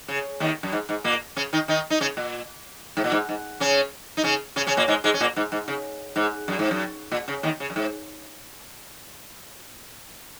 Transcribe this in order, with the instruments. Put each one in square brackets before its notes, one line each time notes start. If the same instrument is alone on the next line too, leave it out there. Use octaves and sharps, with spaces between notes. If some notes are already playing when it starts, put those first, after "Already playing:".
[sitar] C#3
D#2 D#3
F#2
G#2
G#2
A#2 A#3
C#3 C#4
D#3 D#4
D#3 D#4
D#4
C#3 C#4
A#2
G#2
A#2
G#2
G#2
C#3 C#4
D#4
C#3 C#4
C#3 C#4
C#3 C#4
A#2 A#3
G#2 G#3
G#2 G#3
C#4
A#2 A#3
G#2
G#2
C#3
G#2
F#2
G#2
F#2
A#2
C#3
D#2 D#3
C#3
F#2
G#2